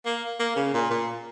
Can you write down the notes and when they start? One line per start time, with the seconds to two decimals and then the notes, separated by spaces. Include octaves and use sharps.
0.05 A#3
0.39 A#3
0.56 C#3
0.74 A#2
0.90 A#2